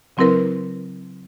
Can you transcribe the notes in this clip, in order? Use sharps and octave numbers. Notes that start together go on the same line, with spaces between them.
C#3 F#3 C4 E4 A#4 B4